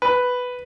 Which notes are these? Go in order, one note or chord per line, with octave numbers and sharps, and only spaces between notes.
B4